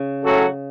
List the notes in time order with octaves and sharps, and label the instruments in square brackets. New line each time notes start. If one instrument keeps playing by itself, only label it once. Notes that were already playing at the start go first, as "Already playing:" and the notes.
Already playing: [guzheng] C#3
[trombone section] A2 F#3 C#4 F#4 A4